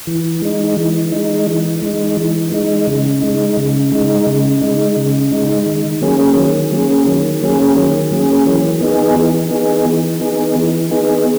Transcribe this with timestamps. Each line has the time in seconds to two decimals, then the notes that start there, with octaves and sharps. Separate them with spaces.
0.07 E3
0.42 G#3 D#4
0.77 E3
1.12 G#3 D#4
1.47 E3
1.82 G#3 D#4
2.17 E3
2.52 G#3 D#4
2.87 C#3
3.22 G#3 D#4
3.57 C#3
3.92 G#3 D#4
4.27 C#3
4.61 G#3 D#4
4.97 C#3
5.32 G#3 D#4
5.66 D#3
6.01 F#3 A#3 C#4 G#4
6.37 D#3
6.71 F#3 A#3 C#4 G#4
7.06 D#3
7.41 F#3 A#3 C#4 G#4
7.76 D#3
8.11 F#3 A#3 C#4 G#4
8.46 E3
8.81 B3 D#4 G#4
9.16 E3
9.51 B3 D#4 G#4
9.86 E3
10.21 B3 D#4 G#4
10.56 E3
10.91 B3 D#4 G#4